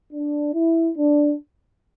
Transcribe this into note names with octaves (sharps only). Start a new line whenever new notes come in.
D4
E4
D4